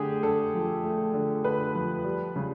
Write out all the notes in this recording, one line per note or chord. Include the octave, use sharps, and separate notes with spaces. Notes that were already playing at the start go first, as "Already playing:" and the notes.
Already playing: D3 A3 G4 G#4
D3 A4
F3
A3
D3
D3 B4
F3
G3
C#3